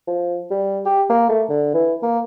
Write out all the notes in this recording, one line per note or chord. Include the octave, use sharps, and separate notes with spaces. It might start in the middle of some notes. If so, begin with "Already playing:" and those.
F3
G3
G4
A#3
A3
D3
E3
A#3